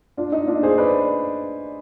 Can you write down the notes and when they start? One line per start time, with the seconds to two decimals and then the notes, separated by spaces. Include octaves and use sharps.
0.17 D4 F4
0.32 D#4
0.47 D4 F4
0.63 G#4 C5
0.78 B4 D5